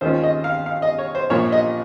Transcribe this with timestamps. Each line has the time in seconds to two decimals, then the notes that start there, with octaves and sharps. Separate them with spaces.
0.01 D#2 D#3 G#3 C#4 F4 C5
0.24 D#5
0.44 F5
0.66 F5
0.82 D#5
0.99 C#5
1.15 C5
1.30 A#1 A#2 F3 C#5
1.52 D#5